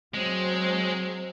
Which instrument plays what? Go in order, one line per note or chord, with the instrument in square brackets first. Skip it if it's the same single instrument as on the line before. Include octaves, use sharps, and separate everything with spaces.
[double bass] F#3 C4 [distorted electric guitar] G#3